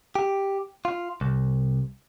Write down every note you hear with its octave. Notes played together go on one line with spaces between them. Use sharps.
G4
F4
C2